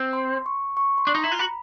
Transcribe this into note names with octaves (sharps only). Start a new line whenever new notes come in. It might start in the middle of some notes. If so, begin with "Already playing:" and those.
Already playing: C4
C6
C#6
C#6
C6
D4
D#4
A#5
E4
F4
F#4 B5